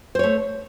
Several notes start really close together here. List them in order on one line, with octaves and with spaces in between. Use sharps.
C5 C#5 A3